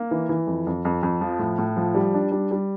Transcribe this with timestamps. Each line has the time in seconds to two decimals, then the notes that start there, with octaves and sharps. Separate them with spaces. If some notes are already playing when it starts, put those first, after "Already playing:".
Already playing: A#3
0.11 E3
0.29 E3
0.47 F2
0.67 F2
0.85 F2
1.03 F2
1.21 F3
1.39 A2
1.58 A2
1.76 F3
1.95 G3
2.14 D4
2.32 G3
2.51 G3